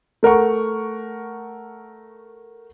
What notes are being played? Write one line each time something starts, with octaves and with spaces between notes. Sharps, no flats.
A3 A#4 F#5 C#6